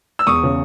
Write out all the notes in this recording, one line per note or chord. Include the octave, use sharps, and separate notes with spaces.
E6
E2 C#6 D#6
C#3